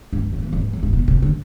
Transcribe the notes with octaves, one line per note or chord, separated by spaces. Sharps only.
G2
G2
F2
E2
F2
G2
F2
G2
B2
C3
D3